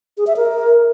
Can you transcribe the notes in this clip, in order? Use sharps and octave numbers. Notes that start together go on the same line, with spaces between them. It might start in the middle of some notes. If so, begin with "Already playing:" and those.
G#4
E5
A#4